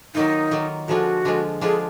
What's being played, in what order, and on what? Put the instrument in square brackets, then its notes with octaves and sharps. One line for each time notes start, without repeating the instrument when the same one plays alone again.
[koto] D#3 F#3 A#3 F4 [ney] D#4
[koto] D#3 F#3 A#3 F4
[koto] D3 F3 G#3 D4 F4 [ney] F#4
[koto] D3 F3 G#3 D4 F4
[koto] D3 F3 G#3 D4 F4 [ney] G#4